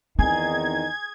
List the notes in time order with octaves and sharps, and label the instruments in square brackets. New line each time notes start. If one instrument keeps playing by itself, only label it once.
[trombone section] E2 D#3 D#4 [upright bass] C4 [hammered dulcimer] G#4 [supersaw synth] G#6